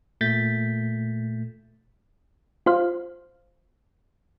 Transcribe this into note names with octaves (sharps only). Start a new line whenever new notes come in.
A#2 A3 G6 A6 B6
F4 C5 F5